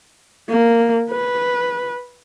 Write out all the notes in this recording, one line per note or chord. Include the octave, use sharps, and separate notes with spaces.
A#3
B4